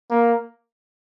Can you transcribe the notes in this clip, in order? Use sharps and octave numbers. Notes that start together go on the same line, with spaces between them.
A#3